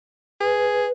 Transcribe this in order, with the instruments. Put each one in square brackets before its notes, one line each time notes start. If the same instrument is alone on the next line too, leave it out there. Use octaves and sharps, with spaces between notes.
[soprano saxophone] G#4 [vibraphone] B4